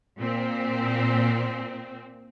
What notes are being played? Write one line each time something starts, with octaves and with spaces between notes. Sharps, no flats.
A#2 C4